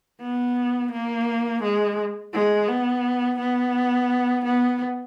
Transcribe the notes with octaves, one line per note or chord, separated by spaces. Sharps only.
B3
A#3
G#3
G#3
B3
B3
B3